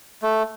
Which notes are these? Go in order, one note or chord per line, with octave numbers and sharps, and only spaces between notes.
A3